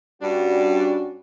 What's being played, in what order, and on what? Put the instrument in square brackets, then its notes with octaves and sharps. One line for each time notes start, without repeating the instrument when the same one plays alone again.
[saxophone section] G2 D4 [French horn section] G3 C#4 F#4